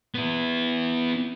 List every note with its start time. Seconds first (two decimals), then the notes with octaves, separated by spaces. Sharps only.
0.15 B3 E4